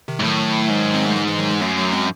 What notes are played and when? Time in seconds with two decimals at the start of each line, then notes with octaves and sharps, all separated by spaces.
0.08 C3 D#3
0.20 G#2
0.23 A2 D#3 F#3
0.70 G#2
0.94 C4
1.05 A3
1.16 E3 G#3
1.27 E3 G#3
1.39 D#3 F#3
1.50 E3 G#3
1.61 F#2 F#3 A3
1.77 F#3 A3
1.92 G#3 C4